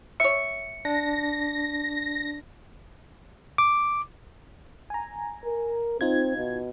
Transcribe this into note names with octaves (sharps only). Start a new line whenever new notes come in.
C#5 E5 C#7
D4 A#6
D6
G#5 A#5
A#4
C4 D#4 F4 G#6
B2